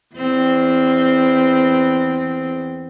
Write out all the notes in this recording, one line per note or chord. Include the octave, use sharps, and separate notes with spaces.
E2 C4